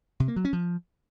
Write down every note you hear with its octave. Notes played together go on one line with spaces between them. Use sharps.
C3
A#3
F#3
C#4
F3